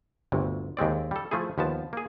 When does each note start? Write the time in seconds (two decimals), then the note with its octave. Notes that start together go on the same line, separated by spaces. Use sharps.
0.32 G1 D2 C3
0.77 D#2 G#3 C4 D5
1.11 G3 A4
1.31 F3 A3 E4 G#4
1.58 D#2 F3 B3 A5
1.93 A#3 G#4